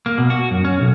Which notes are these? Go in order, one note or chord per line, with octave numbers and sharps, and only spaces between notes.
A#3
B2
F#4
F#2
C#4
B1